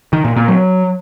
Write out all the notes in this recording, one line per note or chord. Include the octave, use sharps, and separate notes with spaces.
D#3
A#2
A#2
F#3